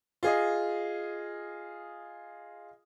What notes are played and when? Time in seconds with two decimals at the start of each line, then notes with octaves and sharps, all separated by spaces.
0.23 F4 G#4 D#5